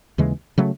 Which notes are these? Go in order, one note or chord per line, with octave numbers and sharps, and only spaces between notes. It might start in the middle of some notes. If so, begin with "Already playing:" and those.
D#2 C#3 E3 G#3
C#3 F#3 A3